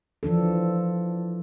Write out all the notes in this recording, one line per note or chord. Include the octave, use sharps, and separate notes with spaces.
E3 F3 D4 A4